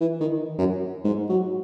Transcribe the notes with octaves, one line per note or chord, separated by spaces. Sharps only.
E3
D#3
F#2
G#2
F#3